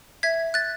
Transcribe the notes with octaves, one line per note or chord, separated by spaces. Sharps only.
E5 G#6 B6
F#6 A6